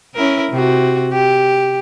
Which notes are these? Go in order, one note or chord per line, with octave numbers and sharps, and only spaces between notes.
C#4 E4 A#4
C3 F#4
G4